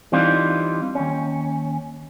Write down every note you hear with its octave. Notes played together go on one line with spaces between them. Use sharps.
E3 G3 C4 D4 D#4 F4
D#2 C#4